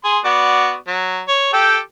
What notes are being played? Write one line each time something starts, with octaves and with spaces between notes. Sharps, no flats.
G#4 C6
B3 F#4 D5
F#3
C#5
G4 A4 G5